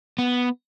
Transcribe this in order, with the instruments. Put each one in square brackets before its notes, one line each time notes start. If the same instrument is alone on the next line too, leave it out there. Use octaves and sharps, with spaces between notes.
[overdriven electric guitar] B3